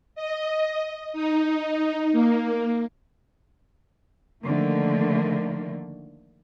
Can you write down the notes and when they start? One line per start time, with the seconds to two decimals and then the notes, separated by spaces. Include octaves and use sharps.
0.15 D#5
1.13 D#4
2.12 A#3
4.45 D3 D#3 F3 A3 A#3